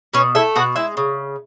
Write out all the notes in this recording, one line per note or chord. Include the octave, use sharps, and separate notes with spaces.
B2 C#4 C#5
A3 E4 E5
B2 F#4 F#5
G#3 E4 E5
C#3